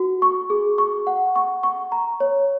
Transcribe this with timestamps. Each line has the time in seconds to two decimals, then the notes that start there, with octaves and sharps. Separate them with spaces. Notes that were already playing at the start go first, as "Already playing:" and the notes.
Already playing: F#4
0.22 C#6
0.50 G#4
0.78 C#6
1.07 F#5
1.36 C#6
1.63 C#6
1.92 A#5
2.20 C#5